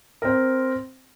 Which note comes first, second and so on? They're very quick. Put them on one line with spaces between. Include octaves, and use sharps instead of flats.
A#4 C4 C5